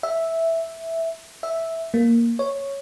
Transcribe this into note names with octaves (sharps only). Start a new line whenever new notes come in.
E5
E5
A#3
C#5